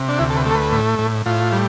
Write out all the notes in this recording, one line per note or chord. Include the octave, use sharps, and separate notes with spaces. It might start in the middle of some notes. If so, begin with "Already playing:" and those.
Already playing: C3
D4
D2 E4
A4
B4
A3 A4
B4
A2
A2
A2 F4
G3